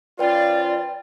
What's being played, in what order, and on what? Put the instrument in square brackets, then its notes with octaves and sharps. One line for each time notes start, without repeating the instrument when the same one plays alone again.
[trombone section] F3 C#4 F4 [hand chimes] B4 G5 [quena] D5